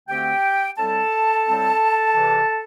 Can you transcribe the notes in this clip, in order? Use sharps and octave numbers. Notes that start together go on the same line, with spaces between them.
D2 D3 A3 C4 G4 G5
A2 G3 C4 A4 A5
A2 G3 C4
E2 C3 E3